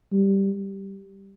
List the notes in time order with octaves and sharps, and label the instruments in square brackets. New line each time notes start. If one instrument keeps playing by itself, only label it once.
[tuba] G3